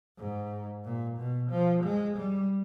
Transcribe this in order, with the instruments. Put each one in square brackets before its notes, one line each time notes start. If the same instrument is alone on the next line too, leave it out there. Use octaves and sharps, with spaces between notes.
[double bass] G#2
A#2
B2
F3
G#3
G3